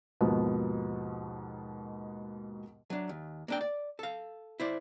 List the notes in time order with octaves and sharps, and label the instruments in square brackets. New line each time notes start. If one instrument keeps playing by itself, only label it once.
[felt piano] D#2 G#2 B2 F3 B3
[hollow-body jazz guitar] F#3 D4
D#2
A#3 D4 G5
D5
A4 F5
E4 C5 D5